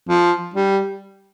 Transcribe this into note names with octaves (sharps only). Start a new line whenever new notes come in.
F3
G3